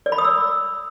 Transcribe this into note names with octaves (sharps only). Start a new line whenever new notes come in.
D5
B5
D#6
E6